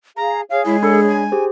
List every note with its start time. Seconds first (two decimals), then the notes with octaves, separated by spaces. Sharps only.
0.17 G#4 F5 A#5
0.50 G#4 C#5 F5
0.66 G#3 E4
0.83 D4 A4 B5 G#6
1.08 G#5
1.32 G4 G#4 C5